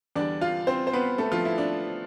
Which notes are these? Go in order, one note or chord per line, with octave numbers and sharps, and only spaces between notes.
E2 D3 G3 D4 D5
F4 F5
C4 C5
C5
B3 B4
A3 A4
F3 F4
E4
D4